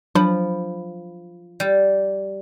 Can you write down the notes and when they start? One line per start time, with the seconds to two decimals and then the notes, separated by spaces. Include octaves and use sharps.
0.15 F3 F#3 D4 B5
1.60 G3